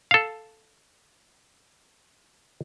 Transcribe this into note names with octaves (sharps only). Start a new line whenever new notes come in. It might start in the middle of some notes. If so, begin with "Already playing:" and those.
A4 F5